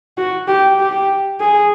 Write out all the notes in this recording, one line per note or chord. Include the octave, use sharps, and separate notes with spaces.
F#4
G4
G4
G#4